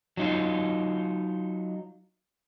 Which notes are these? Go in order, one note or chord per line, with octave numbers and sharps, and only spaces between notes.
F#3 D#4 F4